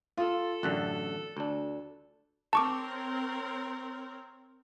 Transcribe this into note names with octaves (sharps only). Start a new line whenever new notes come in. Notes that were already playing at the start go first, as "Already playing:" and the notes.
F4 A4
A1 F#2 D3 F#6
D2 D4
C4 A#4 C#5 A5 C#6 D6